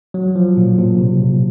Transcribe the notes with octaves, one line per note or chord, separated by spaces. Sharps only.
F#3
F3
A#2
A#2
C3